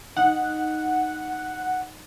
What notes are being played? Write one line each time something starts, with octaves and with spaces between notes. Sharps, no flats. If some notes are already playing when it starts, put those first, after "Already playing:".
D#4 F#5